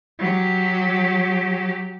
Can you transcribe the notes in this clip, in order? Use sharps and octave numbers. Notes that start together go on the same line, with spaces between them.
F#3 G4